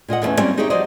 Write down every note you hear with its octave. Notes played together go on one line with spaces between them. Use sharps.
A#2 F4 D#5 F#5
E2 D3 A3 B3 C#4
F#3 G3 A#3 C4 C#4 G4
D#4 G4 G#4 C#5 D#5 E5
F3 F#3 F#4 C5 D5 D#5